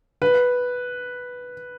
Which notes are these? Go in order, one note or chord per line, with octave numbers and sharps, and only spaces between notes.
B4